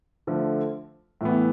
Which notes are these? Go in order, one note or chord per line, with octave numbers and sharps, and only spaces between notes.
D3 F3 A3
A2 E3 B3